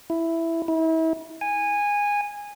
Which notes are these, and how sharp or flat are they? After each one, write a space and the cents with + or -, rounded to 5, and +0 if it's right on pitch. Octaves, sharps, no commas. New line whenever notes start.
E4 +5
E4 -35
G#5 -15